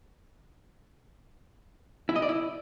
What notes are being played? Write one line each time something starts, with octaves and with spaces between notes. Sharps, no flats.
E4
D#5
D5
E4